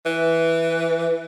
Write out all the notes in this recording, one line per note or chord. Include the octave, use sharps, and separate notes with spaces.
E3